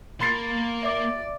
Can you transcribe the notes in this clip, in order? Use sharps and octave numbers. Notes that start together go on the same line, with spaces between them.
A#3 A#4 B5 C6 A6 C7
D5 E5 D6